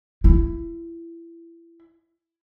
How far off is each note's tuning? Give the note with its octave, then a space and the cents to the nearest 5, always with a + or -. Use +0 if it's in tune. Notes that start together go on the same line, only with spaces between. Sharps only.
E4 +25